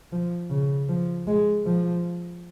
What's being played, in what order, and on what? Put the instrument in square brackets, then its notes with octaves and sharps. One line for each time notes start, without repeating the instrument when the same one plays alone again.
[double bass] F3
C#3
F3
G#3
F3